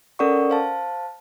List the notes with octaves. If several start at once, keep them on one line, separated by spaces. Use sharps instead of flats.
C#4 A4 A#4 D5 F#5 C#6
C5 F5 A5